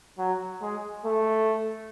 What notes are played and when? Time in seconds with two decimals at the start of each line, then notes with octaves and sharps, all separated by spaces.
0.19 F#3
0.62 G#3
1.05 A3